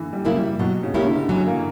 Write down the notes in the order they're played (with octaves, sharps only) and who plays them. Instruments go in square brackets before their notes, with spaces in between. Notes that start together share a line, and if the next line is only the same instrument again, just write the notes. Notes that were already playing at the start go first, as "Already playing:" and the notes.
Already playing: [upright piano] D3 E3
G3
[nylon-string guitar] C#3 F#3 A#3 E4
[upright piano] G3
[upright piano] B2 [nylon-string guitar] F#3
[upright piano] C#3
[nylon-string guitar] A#3 C#4 E4 G4
[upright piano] D3
[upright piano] E3 [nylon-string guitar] F#3
[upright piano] A#3